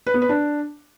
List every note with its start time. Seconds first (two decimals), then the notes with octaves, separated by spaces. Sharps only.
0.07 B4
0.14 B3
0.22 B4
0.29 D4